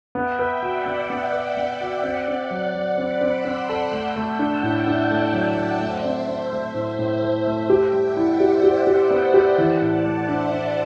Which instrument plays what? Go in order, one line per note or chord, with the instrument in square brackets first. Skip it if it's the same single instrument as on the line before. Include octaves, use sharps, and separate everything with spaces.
[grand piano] B3 [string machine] E5 G5
[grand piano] B4
[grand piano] F#4 [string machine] D5 F#5
[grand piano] B3
B3
B4
B3
F#4
C4
C4
F#3
F#3
[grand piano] C4 [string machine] B5 D6
[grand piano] C4
[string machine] C6 E6
[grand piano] C4
[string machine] E6 G6
[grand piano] A4
[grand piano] A3 [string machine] E6 G6
[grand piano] A3
[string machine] F#5 A5
[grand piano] D4
[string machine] E5 G5
[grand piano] A2
[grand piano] D4 [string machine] D5 F#5
[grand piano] A3
[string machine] F#5 A5
[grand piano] F#3
[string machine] D5 F#5
[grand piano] F#3
[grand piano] A3 [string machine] C5 E5
[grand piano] C4
C4
A3
A2
A2
A3
A3
[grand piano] G4 [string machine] E5 G5
[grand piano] G3
[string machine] D5 F#5
[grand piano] E4
[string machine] C5 E5
[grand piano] G4
[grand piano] G4 [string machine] D5
[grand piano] G4
[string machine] E5 G5
[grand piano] B3
[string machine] E5 G5
[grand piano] G4
[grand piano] E3 [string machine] F#5 A5
[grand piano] A2
[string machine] D5 F#5
[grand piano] A3
[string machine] C5 E5
[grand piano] D4
[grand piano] D4 [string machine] C5